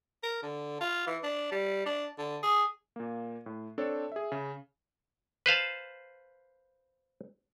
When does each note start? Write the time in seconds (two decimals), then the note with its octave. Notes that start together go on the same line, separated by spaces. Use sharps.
0.23 A#4
0.43 D3
0.81 F4
1.07 E3
1.23 D4
1.52 G3
1.86 D4
2.18 D3
2.43 G#4
2.96 A#2 A#3
3.46 A2
3.78 C4 D4 A4 C#5
4.12 G#4 E5
4.32 C#3
5.46 B4 C5 F5 A5